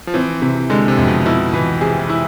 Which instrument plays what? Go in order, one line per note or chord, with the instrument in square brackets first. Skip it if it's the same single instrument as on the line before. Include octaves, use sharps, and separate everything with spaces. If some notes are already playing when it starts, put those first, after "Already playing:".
[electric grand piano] F3
[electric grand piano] E3 [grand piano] C4
[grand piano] C3
[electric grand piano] D3 [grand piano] G#3
[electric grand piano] C3
[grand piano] F2
[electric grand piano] B2
[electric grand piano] B2 [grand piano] E4
[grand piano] E3
[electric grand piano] C3 [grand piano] G#4
[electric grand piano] E3
[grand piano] E4